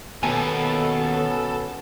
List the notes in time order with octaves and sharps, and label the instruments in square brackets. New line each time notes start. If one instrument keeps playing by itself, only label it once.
[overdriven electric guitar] D#2 [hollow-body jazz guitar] B2 G#5 [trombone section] B3 C#4 [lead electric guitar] A4